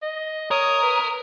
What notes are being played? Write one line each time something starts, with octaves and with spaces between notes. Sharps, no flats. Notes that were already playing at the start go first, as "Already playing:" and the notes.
D#5
A#4 C#5 D#6
B4